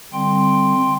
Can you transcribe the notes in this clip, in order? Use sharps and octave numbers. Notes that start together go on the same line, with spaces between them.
D3 G3 C4 G5 C6